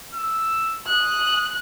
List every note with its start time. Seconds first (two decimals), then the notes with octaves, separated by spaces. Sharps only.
0.15 E6
0.87 D#6 F#6